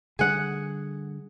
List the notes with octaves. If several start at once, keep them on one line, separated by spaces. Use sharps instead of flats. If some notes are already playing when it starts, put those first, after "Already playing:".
D3 G3 G#4 F#5